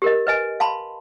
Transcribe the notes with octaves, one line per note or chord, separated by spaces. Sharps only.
G4 A#4 D#5
B4 D#5 G#5
F5 A5 B5 C6